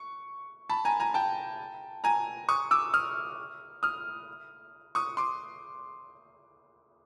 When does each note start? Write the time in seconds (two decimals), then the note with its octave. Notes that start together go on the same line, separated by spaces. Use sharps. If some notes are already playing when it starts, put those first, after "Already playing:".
Already playing: C#6
0.69 A5 B5
0.85 G#5 A#5
1.00 G#5 A#5
1.14 G5 A5
2.04 G#5 A#5
2.49 C#6 D#6
2.71 D6 E6
2.94 D#6 F6
3.83 D#6 F6
4.95 C#6 D#6
5.17 C6 D6